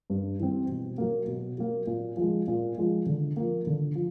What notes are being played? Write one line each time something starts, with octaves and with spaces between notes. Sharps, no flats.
G2
E3 G3 C4
B2
F#3 A#3
B2
F#3 A#3
A#2
F3 G#3
A#2
F3 G#3
D3
F3 A#3
D3
F3